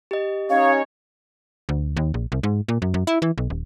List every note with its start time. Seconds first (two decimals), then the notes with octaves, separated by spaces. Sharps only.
0.11 G4 D#5
0.50 C#4 D#4 C#5 F5
1.69 D2
1.97 D#2
2.14 A#1
2.32 C2
2.43 G#2
2.68 A#2
2.82 F#2
2.94 F#2
3.07 E4
3.22 E3
3.38 B1
3.50 D#1